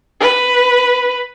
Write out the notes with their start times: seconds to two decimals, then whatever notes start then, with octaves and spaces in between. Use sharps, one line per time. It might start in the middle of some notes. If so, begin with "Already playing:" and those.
0.20 B4